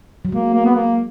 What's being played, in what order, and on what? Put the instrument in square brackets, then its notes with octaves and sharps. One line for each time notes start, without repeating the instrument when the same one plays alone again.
[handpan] F#3
[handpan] G#3 [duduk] A#3
[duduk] A#3
B3
A#3